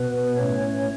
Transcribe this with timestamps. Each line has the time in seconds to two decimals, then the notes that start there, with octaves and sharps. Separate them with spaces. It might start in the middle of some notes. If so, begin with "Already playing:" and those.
Already playing: B2 B3 B4
0.36 A2 A3 C#4 C#5